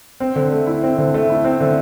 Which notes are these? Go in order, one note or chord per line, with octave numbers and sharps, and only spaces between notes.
C4
D3
A3
E4
C4
D3
A3
E4
C4
D3